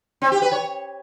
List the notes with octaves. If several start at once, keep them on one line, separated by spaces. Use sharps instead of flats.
C4
G4
B4
C#5